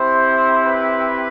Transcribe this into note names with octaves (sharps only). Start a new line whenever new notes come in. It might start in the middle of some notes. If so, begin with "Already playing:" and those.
Already playing: C4 E4 G4 C5
B4